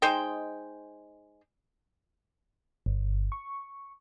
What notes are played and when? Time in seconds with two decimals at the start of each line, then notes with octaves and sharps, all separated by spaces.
0.02 G#3 D#4 C5 G5
2.86 G1
3.32 C#6